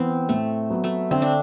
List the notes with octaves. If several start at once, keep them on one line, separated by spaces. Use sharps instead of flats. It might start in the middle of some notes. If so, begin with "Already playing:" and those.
Already playing: E3 B3 C4
A2 A3
F#3 B3
A3
D3 C4
D4